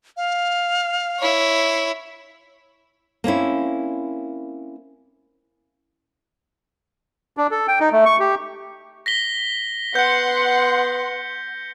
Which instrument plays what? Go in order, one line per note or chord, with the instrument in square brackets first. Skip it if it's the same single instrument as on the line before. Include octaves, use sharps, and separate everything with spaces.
[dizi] F5
[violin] E4 C#5
[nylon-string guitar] A#3 C4 C#4 E4
[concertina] D4
A4
G5
D#4
A3
C#6
G4
[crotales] A#6 B6 G7
[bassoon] B3 [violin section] F#5 C6 [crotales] G6 C#7